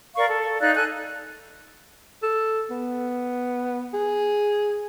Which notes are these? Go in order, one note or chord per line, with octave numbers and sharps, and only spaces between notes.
A#4 D5 F5 C#6
A4
D#4 D5 F5 F#6
A4 G#5 F#6
A4
B3
G#4